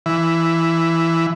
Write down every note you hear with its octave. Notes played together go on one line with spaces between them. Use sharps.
E3